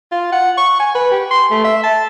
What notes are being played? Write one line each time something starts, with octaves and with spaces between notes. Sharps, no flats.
F4
F#5
C#6
G#5
B4
G4
C6
A3
E5
A5